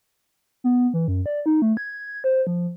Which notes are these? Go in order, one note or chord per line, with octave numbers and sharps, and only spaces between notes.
B3
E3
F#2
D5
D#4
A3
G#6
C5
F3